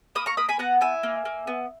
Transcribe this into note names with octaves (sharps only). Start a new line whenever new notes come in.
A#3 B5 D#6
A#5 C#6
A#3 B5 D#6
G#5 B5
B3 F#5 A#5
E4 E5 G#5
A#3
A#3
B3